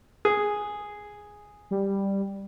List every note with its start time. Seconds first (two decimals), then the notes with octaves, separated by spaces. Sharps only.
0.25 G#4
1.71 G3